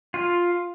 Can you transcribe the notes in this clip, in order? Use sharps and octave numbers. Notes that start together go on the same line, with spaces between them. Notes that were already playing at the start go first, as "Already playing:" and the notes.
F4